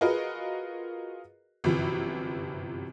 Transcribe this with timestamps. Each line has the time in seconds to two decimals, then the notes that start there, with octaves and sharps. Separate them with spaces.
0.01 F4 F#4 G#4 A#4 B4 D#5
1.64 G1 F#2 C3 E3 F3